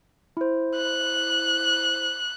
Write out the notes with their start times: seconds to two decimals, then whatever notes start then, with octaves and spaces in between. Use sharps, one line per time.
0.37 E4 C5
0.76 F#6